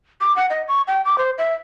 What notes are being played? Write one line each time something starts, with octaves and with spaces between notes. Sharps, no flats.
D6
F#5
D#5
C#6
G5
D6
C5
E5